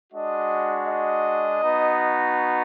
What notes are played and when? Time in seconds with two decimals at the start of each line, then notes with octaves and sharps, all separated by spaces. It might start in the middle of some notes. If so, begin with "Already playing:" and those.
0.12 G#3 D4 F#4 D#5
0.87 D#5
1.61 B3 D#4 F#4